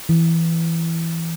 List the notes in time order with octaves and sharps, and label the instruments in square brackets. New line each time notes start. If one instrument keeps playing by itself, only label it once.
[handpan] E3